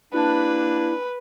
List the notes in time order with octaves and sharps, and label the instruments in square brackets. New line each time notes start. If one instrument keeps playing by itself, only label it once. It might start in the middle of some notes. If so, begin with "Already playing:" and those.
[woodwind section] G3 A#3 D4 [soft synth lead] E4 [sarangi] B4